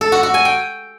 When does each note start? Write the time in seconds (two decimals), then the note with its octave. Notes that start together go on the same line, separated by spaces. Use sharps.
0.01 A4
0.12 F#4
0.23 F#4
0.34 G#5
0.45 G5